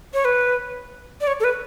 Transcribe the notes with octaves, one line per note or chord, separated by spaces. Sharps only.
C#5
B4
D5
C#5
A4
B4